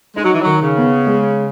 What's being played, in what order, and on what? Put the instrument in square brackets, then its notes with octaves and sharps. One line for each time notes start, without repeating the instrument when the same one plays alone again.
[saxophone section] G#3 [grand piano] D#4
[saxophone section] F#3
E3
[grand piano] D#3 [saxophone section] F#3
[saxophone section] C#3
[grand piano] B3
G#3